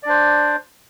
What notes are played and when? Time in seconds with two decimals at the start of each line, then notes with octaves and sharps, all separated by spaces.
0.03 D5
0.06 D4
0.09 C5